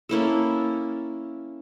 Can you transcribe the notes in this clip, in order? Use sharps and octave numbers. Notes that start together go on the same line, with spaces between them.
A#3 C#4 E4 A4